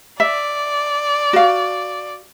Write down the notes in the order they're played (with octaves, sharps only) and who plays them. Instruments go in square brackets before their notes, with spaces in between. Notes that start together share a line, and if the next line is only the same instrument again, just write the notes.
[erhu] D5 [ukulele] E5
[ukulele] F#4 F5